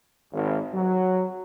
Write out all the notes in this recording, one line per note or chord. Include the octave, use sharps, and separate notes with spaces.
G#1
F#3